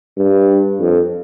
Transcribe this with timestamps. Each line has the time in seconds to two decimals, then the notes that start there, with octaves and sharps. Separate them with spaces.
0.17 G2
0.80 F2